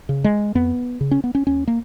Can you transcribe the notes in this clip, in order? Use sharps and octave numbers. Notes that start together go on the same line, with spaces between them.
C#3
G#3
F2 B3
C#3
C#4
B3
C#4
D#2 C#4
A#3